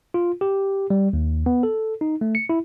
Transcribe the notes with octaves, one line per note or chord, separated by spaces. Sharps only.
F4
G4
G3
D#2
B3
A4
D#4
A3
C#7
E4